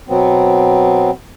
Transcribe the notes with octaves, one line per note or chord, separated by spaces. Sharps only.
B2 F#3 B3 C4